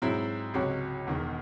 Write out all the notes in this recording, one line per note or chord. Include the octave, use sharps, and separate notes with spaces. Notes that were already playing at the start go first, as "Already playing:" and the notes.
G#2 F#3 C4 E4
C#2 C3 F#3 C#4 F#4
E1 E2 D#3